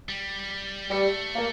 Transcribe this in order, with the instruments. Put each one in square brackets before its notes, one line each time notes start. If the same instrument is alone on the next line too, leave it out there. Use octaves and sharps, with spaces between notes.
[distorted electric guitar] G3
[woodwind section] G3 [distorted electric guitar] A3
[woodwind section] A#3